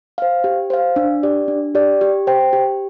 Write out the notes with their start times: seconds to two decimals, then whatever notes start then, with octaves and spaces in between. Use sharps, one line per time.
0.18 C5 F5
0.44 G4
0.70 C5 F5
0.96 D4
1.23 G4 D5
1.48 D4
1.75 G4 D5
2.01 G4
2.27 C5 G5
2.53 G4